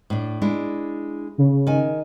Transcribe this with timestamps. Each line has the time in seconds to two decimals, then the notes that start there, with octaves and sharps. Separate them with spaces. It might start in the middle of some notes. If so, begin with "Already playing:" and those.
0.10 A2 D4
0.42 G#3 D4 E4
1.38 C#3
1.67 D#3 G#5